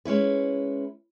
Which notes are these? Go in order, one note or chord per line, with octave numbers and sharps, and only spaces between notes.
G#3 C#4 E4 B4